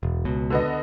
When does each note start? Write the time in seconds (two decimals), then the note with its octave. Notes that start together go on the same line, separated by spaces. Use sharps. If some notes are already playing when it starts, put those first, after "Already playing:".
0.03 E1
0.25 C#2 B2
0.50 D3 B3 D#5